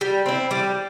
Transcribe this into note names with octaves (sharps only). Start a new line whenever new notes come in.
G3
C4 E4
G3